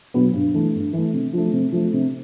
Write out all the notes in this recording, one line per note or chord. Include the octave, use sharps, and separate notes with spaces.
B2 F#3 B3
G2
E3 A3
G2
E3 A3
C3
F3 A3
C3
F3 A3
C3